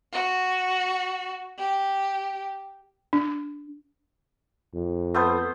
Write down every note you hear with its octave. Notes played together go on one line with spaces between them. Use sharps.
F#4
G4
D4
F2
A3 B3 C5